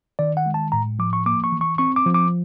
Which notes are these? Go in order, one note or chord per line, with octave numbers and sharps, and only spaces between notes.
D#3 D5
F#5
G#3
A5
A2 A#5
F3 D6
C#6
A#3 D6
C#6
E3
C#6
C4 C#6
D6
F3
D6